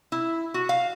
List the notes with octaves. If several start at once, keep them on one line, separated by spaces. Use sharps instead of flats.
E4
F#4
F5